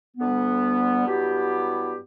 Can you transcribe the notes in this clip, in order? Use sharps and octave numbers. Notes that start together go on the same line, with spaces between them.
D2 D3 G3 B3
G2 F#3 B3 E4 G4